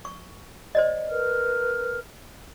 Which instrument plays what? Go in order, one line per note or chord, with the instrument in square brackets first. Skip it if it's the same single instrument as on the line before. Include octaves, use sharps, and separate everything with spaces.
[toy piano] C#6
C5 D5 D#5
[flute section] A#4 B4 F6